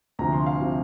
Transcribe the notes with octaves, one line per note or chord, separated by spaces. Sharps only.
D2 C3 F3 A#5
C6
F5
C3 F3